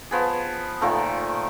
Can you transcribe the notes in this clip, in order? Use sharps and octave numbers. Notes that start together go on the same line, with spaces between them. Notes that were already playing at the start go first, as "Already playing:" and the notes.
F3 B3 G#4
A#2 D#3 F3 A3